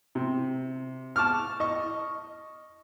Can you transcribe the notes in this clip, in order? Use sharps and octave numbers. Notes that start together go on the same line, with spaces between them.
C3
A5 C#6 D6 F6
D#5 C#6